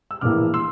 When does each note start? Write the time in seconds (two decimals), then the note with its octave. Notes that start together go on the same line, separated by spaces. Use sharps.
0.11 E6
0.21 A#1 A2 E3 A#3 D6 F6
0.54 C6 E6